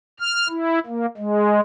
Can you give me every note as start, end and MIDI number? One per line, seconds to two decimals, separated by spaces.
0.20 0.47 89
0.49 0.79 64
0.86 1.06 58
1.18 1.60 56